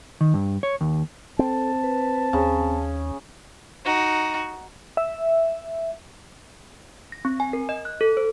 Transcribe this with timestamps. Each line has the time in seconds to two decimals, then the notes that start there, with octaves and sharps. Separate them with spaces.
0.21 D#3
0.34 G2
0.63 C#5
0.81 D#2
1.39 C4 A4 A5
1.83 B4
2.33 D#2 C#3
3.85 D#4 F#4
4.97 E5
7.12 A#6
7.25 C4
7.40 G#5
7.53 A#4
7.69 D#5
7.85 F#6
8.01 A4
8.17 C5